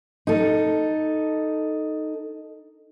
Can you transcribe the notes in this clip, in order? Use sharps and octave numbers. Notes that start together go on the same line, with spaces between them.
D#4 A4